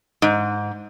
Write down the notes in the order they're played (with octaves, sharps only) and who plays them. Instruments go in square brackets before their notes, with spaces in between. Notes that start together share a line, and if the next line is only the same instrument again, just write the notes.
[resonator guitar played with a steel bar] G#2